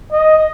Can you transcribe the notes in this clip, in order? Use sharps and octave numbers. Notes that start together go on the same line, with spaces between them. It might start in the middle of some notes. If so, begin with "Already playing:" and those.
D#5